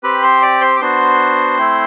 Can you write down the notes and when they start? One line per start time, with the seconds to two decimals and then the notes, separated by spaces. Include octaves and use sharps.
0.03 C4 G4 B4 B5
0.22 C5 C6
0.42 D5 D6
0.61 C5 C6
0.77 D6
0.81 B3 D4 F#4 C5 C6
1.58 A3 C4 E4